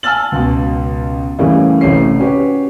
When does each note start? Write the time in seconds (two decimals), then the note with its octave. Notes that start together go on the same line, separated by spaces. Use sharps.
0.03 G#5 A5 E6 F6 A6 F#7
0.32 C#2 B2
1.39 A2 C#3 E3 G3 A3 A#3
1.81 A1 A2 C3 C#4 C7
2.20 C#4 F#4 G4 B4 C#5